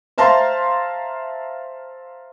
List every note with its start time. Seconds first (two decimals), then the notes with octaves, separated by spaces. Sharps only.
0.18 C5 E5 F5 A5 A#5 C6